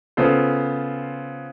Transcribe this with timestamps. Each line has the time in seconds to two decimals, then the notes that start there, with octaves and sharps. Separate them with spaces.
0.17 C#3 B3 F4 A4 C5